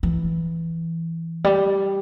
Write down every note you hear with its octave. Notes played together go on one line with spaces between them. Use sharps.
E3
G3